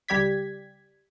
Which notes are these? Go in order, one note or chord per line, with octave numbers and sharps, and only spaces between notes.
C#2 G3 G4 D5 G#6 B6